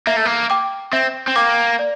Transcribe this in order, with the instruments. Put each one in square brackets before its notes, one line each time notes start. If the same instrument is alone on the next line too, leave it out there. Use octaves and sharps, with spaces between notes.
[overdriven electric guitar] A#3 [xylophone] E5
[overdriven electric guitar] A3
A#3
[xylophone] G5 D6
[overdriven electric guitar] C4 [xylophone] E5
[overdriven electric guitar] C4
[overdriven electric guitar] A#3 [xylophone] G5 D6
[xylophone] D5